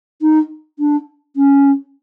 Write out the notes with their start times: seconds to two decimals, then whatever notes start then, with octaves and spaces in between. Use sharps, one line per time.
0.22 D#4
0.79 D4
1.36 C#4